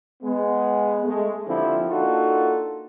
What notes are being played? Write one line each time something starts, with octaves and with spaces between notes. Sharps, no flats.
G#3 B3
G#3 A3
D#2 D3 F3 C4 E4 G4
A#3 D4 D#4 F4 F#4 A4